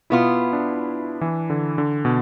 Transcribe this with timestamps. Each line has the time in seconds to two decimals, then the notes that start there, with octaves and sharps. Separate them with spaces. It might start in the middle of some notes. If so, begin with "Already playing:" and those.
0.10 B2 B3 E4 F4
0.53 D4
1.21 E3
1.50 D3
1.78 D3
2.05 B2